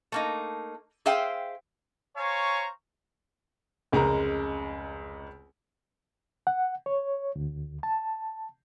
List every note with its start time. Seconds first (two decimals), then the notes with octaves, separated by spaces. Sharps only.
0.12 A3 A#3 D#4
1.06 G#4 C5 E5 F5 G5
2.16 C5 C#5 F5 G#5 A#5 C#6
3.92 F1 C#2 C#3 G#3 A#4 A#5
6.47 F#5
6.86 C#5
7.36 D2
7.83 A5